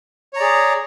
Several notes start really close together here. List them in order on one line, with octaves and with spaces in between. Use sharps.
C#5 A#5 D5 G#4